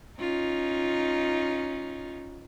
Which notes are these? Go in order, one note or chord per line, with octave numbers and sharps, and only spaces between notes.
C#4 D#4 F4